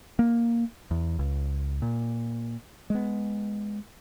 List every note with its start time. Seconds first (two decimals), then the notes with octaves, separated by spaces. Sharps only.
0.19 A#3
0.91 E2
1.19 C#2
1.82 A#2
2.90 G#3 B3